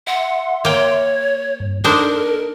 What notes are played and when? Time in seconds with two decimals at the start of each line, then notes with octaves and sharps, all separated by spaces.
0.07 E5 F#5 C6
0.65 A#3 C#5 G5
1.60 G2
1.84 D4 D#4 A4 A#4 C5